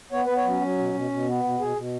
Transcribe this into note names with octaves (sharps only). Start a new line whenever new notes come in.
B3 C#5
B3 B4
C#5
F#3 C#4
F#3
B2
B2
B2
B3
B2
B2 G#4
B2